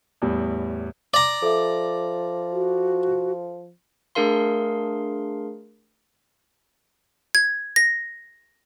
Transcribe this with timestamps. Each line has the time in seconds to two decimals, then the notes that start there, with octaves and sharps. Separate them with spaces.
0.22 E2 A2 G3
1.14 D5 A#5
1.42 F3 A4 E5
2.52 F#4
4.15 A3 D4 G#4 A#4 F5 C6
7.35 G#6
7.76 A#6